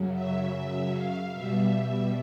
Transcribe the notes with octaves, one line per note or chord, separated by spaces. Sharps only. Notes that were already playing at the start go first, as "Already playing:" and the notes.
Already playing: F#2 C#3 F#3
E5
E5
F5
B2 G3 E5